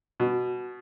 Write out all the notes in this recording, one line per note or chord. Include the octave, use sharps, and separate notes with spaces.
B2